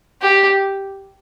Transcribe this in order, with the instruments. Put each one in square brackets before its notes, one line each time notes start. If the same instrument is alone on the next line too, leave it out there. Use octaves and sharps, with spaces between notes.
[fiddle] G4